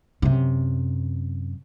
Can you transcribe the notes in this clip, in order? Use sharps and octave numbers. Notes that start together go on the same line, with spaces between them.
F#2 C3